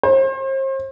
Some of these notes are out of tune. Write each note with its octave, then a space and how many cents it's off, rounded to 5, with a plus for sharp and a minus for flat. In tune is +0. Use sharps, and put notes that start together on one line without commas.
C5 +40